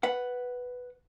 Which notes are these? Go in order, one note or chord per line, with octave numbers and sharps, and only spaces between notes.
B4 F#5